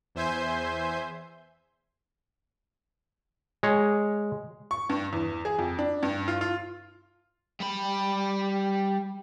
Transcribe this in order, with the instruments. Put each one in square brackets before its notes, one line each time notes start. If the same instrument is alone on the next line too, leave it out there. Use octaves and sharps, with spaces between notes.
[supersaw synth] E2 C5 E5 G#5 C6 G6
[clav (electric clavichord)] G#3 C#5
[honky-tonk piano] C#6
G2
E2
G#4
F2
D4
G2
F4
F4
[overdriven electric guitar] G3 B5